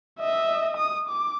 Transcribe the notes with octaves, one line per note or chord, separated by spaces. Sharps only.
D#5 E5
D#6
D6